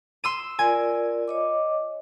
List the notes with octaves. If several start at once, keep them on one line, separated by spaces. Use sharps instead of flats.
C6 E6 D#7
F4 A#4 D5 G#5
C#5 D#5 D6